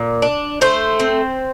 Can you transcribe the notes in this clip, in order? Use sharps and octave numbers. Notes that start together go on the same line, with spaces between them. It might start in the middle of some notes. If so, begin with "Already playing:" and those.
Already playing: A#2
D4
A3 C5
C4